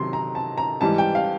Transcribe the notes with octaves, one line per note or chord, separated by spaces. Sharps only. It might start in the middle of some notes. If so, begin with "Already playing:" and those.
Already playing: C3 D#3 F#3 C6
A#5
A5
A#5
G#2 E3 G3 A5
G5
F5